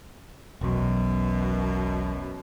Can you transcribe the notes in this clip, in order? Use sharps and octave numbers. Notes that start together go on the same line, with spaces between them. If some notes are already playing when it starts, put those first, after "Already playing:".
E1 B1 F#2 B2